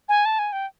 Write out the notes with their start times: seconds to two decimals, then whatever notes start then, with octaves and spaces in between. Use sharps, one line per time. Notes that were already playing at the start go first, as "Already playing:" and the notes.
0.09 G#5
0.25 A5
0.39 G#5
0.52 G5